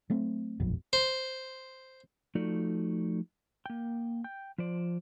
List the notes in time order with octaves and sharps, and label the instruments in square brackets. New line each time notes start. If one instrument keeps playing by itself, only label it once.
[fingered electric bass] F#3 A3 C4
E1 A#1 F2 F#3
[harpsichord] C5
[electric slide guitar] F3 A3 D#4 F#4 A4 D5
A#3 G5
G5
F3 C5 D5